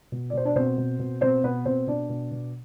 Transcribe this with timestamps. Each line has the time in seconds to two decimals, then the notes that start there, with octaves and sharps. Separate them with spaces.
0.12 B2
0.30 D5
0.33 B2 C5
0.45 D4 D5
0.56 B2 C4 C5
0.78 B2
0.99 B2
1.21 B2 C4 C5
1.43 B2 B3 B4
1.65 B2 C4 C5
1.87 B2 D4 D5
2.09 B2
2.31 B2